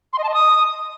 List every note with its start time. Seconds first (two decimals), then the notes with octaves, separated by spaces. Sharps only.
0.13 C6
0.18 D#5
0.24 A5
0.29 D#5
0.34 D#6